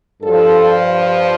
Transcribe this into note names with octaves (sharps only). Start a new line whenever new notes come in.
G2 F3 A4